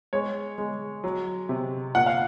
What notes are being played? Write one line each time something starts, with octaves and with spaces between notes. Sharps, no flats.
G#3 C#5
G#3
F#3
C3
A#2 F#5
F5